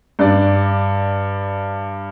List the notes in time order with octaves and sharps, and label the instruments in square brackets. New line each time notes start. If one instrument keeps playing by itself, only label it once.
[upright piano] G2 D5